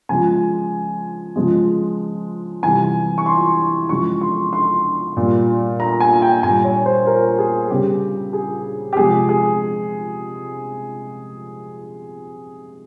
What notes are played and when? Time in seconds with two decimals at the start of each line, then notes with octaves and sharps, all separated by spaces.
0.09 C#3 F3 G#3 G#5
1.36 C#3 F3 G#3
2.63 C3 E3 G3 G#5
3.18 C#6
3.26 C6
3.89 C#3 F3 G#3 C#6
4.21 C6
4.53 C6
5.17 A#2 G3
5.80 A#5
6.00 G#5
6.22 G5
6.43 A#2 G3 G#5
6.64 C#5
6.86 C5
7.07 A#4
7.38 G#4
7.70 C#3 G3 G4
8.33 G#4
8.93 G4
8.97 C3 F3 G#3 G#4
9.29 G#4